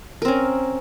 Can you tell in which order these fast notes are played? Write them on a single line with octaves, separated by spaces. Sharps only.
A#4 C4 C#4